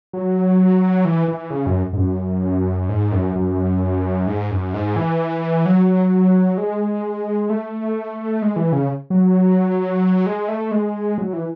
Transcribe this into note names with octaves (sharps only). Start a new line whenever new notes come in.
F#3
E3
E3
C#3
F#2
G#2
F#2
G#2
F#2
F#2
G#2
F#2
G#2
E3
F#3
G#3
A3
G#3
E3
C#3
F#3
G#3
A3
G#3
F#3
E3